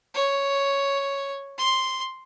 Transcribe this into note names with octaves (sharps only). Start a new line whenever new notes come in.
C#5
C6